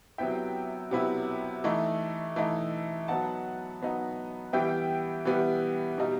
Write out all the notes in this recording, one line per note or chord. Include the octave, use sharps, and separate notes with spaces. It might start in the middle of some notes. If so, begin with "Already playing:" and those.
C3 F#3 B3 E4 E5 G5
C3 F#3 B3 E4
E3 A3 D#4
E3 A3 D#4
F#3 B3 D#4 F#5 A5
F#3 B3 D#4
E3 G3 B3 E5 G5
E3 G3 B3
B2 G3 D#4